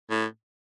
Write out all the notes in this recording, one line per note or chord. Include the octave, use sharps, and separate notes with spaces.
A2